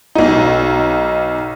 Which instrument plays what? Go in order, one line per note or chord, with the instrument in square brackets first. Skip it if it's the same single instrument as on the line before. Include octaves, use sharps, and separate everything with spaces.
[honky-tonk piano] B1 D#4